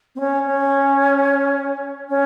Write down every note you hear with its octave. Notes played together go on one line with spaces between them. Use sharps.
C4
C#4
C#4
C#4